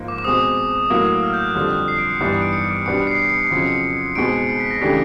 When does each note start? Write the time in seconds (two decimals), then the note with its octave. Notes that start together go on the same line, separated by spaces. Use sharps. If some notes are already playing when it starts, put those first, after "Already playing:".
Already playing: G#2 F3 A#3 D#4
0.08 D6
0.18 D6
0.25 B2 G#3 C4 D#6
0.90 A2 F#3 A#3
1.23 F6
1.33 G6
1.44 F#6
1.55 F2 D3 G3 F6
1.66 F#6
1.88 C7
1.98 D7
2.10 C#7
2.20 G2 E3 G3 B3 D#4 C7
2.32 C#7
2.42 D7
2.53 C#7
2.69 D7
2.86 B2 G3 B3 D4 G4 C#7
3.07 C7
3.18 C7
3.29 C#7
3.40 C7
3.51 F2 C#3 F#3 C#7
3.67 C#7
4.16 B2 G#3 C4 D#4 D7
4.33 C#7
4.49 C7
4.60 B6
4.71 A#6
4.81 C#3 E3 A3 D4 G4 B6